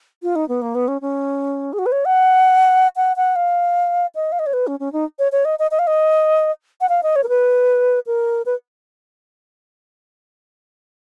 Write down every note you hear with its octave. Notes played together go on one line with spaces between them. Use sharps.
F4
D#4
B3
A#3
B3
C#4
C#4
G#4
F#4
B4
C#5
F#5
F#5
F#5
F5
D#5
F5
D#5
C#5
B4
C#4
C#4
D#4
C#5
C#5
D#5
D#5
D#5
F5
D#5
F#5
F5
D#5
C#5
A#4
B4
A#4
B4